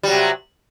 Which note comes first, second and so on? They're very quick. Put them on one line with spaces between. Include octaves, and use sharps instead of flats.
G3 F#3 C3